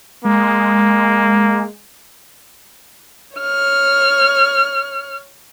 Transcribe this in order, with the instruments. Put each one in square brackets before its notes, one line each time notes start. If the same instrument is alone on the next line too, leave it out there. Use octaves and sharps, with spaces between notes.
[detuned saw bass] G#3 [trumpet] A#3
[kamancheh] C#5 F6